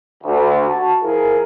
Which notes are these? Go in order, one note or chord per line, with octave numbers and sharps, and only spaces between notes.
D2
F#4 A5
F3 E4 G#4 A#4